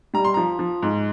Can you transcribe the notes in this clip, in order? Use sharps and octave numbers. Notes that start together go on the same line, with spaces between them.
G3 A#5
C6
F3 A#5
F3
G#2